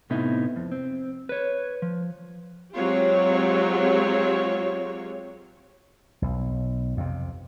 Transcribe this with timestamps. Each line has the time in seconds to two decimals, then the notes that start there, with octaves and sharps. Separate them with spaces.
0.10 A2 C3 B3 D#4 E4
0.56 F2
0.72 C4
1.29 B4 C#5
1.82 F3
2.74 F#3 G#3 C4 F4 G4 C#5
6.22 B1
6.97 F2 C3